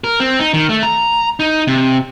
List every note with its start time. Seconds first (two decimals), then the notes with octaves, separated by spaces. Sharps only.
0.04 A#4
0.20 C4
0.39 D#4
0.53 D#3
0.69 A3
0.83 A#5
1.40 D#4
1.67 C3